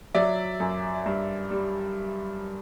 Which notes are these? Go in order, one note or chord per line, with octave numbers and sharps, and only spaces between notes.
F#3 D5 E5
F#2
G2
G3